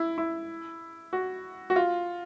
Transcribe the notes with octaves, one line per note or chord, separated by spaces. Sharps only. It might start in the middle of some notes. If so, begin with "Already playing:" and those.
Already playing: E4
E4
F#4
F#4
F4